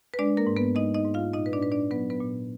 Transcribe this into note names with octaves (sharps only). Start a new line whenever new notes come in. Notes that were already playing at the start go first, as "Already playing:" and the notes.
B4
G#3 D4 D5
A#3 A#4
G#2
B3 B4
G#3 D#4 D#5
D#4 D#5
G#2
F4 F5
A#2 D#4 D#5
B4
D4 D5
A#2 B4
D4 D5
F#3 B3 B4
B3 B4
A#2